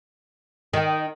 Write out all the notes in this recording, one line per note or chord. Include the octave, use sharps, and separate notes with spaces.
D#3